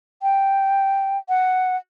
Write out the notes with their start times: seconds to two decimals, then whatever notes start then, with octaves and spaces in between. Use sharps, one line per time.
0.22 G5
1.29 F#5